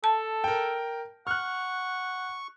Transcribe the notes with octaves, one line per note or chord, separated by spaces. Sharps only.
A4 A5
A#4 G5
F#5 C#6 F6 F#6